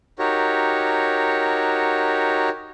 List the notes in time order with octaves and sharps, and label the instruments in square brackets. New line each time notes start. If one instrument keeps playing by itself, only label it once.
[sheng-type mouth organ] D#4 F#4 G4 A#4 C#5